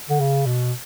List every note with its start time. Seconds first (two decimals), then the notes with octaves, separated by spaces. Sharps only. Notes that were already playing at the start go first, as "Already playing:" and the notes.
0.09 D3
0.20 C#3
0.46 B2